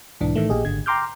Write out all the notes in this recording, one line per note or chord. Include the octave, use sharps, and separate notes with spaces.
B1 G#2 E3 D4
A2 D#3 E3 A3
A#1 A#2 G4 G#4 D#5
G#1 D3 G#6
G5 A#5 C6 D6 F6 G6